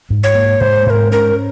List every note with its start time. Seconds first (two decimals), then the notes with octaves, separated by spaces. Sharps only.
0.10 G#2
0.23 C#5
0.35 A#3
0.60 G#2 C5
0.86 G#2 A#4 C5
1.12 C#4 A#4